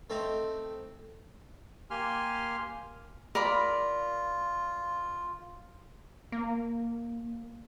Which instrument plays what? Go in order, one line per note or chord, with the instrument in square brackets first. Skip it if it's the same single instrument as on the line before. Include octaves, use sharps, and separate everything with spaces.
[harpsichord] A3 C4 D#4
[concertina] A#3 G4 G#5 C6 F6
[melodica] F4 [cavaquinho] A#4 D5 B5
[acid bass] A#3